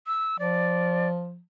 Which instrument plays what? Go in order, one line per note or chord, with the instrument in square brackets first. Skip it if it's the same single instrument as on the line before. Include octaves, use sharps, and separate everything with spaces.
[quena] E6
[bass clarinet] F3 [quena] D5